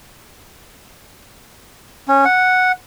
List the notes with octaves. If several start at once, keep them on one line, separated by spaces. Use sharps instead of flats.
C#4
F#5